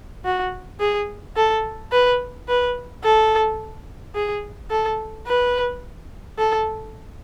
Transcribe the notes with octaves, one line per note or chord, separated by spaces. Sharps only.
F#4
G#4
A4
B4
B4
A4
G#4
A4
B4
A4